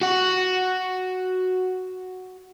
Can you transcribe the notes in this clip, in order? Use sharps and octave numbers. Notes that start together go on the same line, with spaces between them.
F#4 F#5